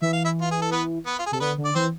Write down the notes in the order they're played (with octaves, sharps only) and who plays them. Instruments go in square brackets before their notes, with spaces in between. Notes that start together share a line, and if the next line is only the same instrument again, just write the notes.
[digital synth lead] E3 [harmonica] E5
[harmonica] F5
E4 E5
F4
G#4
A4
B3 B4
B3 B4
F4
G#4
[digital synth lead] C3 [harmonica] A4
[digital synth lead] D3 [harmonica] B3 B4
[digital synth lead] D3
[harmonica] D5
[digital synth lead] E3 [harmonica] C4 C5